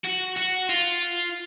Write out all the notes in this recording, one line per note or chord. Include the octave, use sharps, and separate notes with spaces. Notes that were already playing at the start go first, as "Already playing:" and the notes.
F#4
F#4
F4